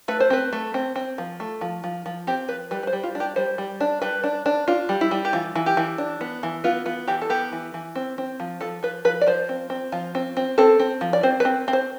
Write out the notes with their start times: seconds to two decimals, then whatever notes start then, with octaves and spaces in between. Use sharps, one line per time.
0.08 A3 B4
0.20 C5
0.30 C4 B4
0.53 A3
0.74 C4
0.96 C4
1.18 F3
1.40 A3
1.61 F3
1.84 F3
2.06 F3
2.27 C4 G4
2.49 F3 B4
2.71 G3 B4
2.83 B4
2.87 C5
2.93 G3
3.03 F4
3.15 D4
3.20 G4
3.36 G3 C5
3.58 G3
3.80 D4
4.02 G3 B4
4.24 D4
4.46 D4
4.68 D4 F4
4.89 G3
5.01 E4
5.11 G3
5.25 G4
5.33 E3 F4
5.55 E3
5.66 G4
5.77 E3
5.98 D4
6.21 B3
6.43 E3
6.64 B3 F4
6.86 B3 F4
7.08 E3 G4
7.22 A4
7.30 B3 G4
7.52 E3
7.74 E3
7.95 C4
8.18 C4
8.40 F3
8.61 F3 A4
8.83 F3 B4
9.05 F3 B4
9.21 D5
9.27 F3 C5
9.49 C4
9.70 C4
9.92 F3 F4
10.15 C4
10.37 C4
10.58 C4 A4
10.79 C4
11.01 F3
11.13 D5
11.23 C4 C5
11.40 B4
11.45 C4
11.68 C4
11.73 C5